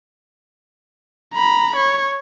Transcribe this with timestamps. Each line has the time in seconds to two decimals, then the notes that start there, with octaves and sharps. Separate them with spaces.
1.34 A#5 B5
1.76 C#5